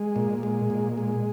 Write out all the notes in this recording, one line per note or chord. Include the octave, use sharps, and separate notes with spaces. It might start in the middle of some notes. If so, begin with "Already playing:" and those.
Already playing: G#3
A#2
G#3
A#2
G#3